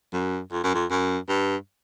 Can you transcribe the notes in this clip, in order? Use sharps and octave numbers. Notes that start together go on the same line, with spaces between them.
F#2
F2
F#2
F2
F#2
G2